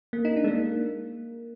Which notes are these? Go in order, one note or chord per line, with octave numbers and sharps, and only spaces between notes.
A#3
D#4
D4
G#3
A#3